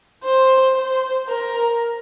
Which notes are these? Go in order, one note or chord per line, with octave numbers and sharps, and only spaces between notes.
C5
C5
A#4